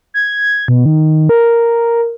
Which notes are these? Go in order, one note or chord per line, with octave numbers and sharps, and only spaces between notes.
G#6
B2
D#3
A#4